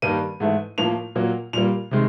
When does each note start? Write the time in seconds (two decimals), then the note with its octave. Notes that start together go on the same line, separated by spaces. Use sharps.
0.02 G2 D#3 G3 A#3 D#7
0.40 G#2 E3 A3
0.78 A2 F3 A#3 F7
1.15 A#2 F#3 A#3
1.53 A#2 G3 A#3 F7
1.91 C3 D#3 G#3